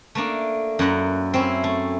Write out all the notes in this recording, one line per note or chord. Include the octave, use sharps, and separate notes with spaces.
A3 A#3 D4
F#2 E4 F#5 A#5
C4 C#4 E4
A3